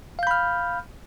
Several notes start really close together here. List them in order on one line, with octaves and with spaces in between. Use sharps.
F5 G6 B5 F6